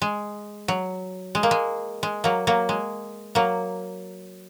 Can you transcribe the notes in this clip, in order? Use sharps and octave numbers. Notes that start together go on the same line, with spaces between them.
G#3
F#3
G#3
A#3
G#3
G#3
F#3 A#3
F#3 A#3
G#3
F#3 A#3